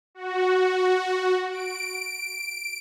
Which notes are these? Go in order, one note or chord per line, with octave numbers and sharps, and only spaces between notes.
F#4
D7